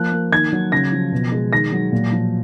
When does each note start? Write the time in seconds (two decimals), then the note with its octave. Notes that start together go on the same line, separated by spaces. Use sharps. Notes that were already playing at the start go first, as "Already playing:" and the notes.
Already playing: F3 A#3 F#6
0.12 A#3
0.32 D#3 G#6
0.52 F#3
0.72 C#3 A#6
0.92 F3
1.12 B2
1.32 G#3
1.52 D#3 A#6
1.72 F#3
1.92 A#2
2.12 F3